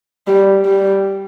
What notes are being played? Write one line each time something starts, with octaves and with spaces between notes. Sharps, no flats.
G3
G3